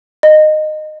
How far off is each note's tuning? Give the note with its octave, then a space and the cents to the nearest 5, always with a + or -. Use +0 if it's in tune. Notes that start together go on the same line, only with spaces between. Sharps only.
D#5 -15